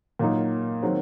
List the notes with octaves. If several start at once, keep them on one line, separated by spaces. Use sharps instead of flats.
A#2 F#3 A#3 D#4
D#3 F#3 C4